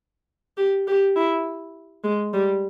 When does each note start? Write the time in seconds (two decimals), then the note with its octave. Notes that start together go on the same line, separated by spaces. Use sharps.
0.57 G4
0.87 G4
1.16 E4
2.04 G#3
2.33 G3